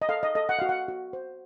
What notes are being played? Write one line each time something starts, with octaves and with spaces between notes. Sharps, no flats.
D#5
A4 F5
D#5
A4 D#5
F#5
F#4 F5
F#5
F#4
C5